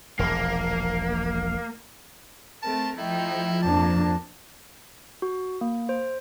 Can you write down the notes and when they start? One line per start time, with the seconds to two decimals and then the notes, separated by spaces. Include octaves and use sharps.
0.19 E1 A#1 A#3
2.62 A3 C4 A#4 A5
2.98 F3 A3 D#4 E4 G5
3.62 F2 A#3 D4 A5
5.22 F#4
5.61 A#3
5.89 C5